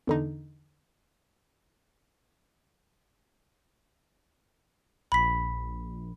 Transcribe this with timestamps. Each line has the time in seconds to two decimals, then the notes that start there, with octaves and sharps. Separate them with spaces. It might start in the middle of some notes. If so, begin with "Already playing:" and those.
0.07 E2 D3 D#4
5.12 A#1 B5 B6